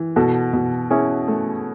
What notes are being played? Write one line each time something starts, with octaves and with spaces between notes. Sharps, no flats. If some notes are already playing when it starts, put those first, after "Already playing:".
Already playing: E3
B2 F#4 A4
B2
C#4 E4 G#4
A3